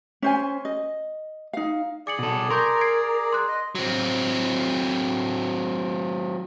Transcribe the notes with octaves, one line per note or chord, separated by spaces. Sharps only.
C#4 C5 G#5
D#5
D#4 F5
G#4 D5 D6 C#7 F#7
B2 A4
A#4 C6 C#6 G6
G#6 C7 D7
C6 F#6
D#5
F#3 C4